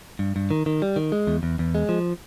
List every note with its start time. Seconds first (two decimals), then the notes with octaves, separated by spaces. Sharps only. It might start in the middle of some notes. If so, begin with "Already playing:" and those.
0.19 G2
0.36 G2
0.51 D#3
0.66 D#3
0.82 G3
0.96 D#3
1.12 G#3
1.27 E2
1.43 E2
1.59 E2
1.75 G#3
1.89 F3